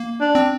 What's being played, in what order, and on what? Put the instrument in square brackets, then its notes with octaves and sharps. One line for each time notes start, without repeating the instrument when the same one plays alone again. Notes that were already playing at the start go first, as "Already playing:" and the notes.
Already playing: [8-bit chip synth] A#3
[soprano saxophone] D4
[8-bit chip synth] C4